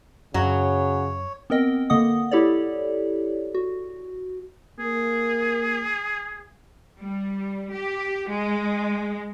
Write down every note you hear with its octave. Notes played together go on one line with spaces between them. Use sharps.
F#2 C#3 F#3 C#5
B3 C4 A#4 D#5 G5
D3 A#3 D#5 F#5 D#6
E4 G4 A4 C#5 D5
F#4
A#3 G#4
G3
G4
G#3